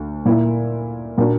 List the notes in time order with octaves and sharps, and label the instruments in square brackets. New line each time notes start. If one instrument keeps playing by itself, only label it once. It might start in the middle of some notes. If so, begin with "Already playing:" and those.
Already playing: [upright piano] D2
A#2 A#3 E4
A#2 A#3 D4 F#4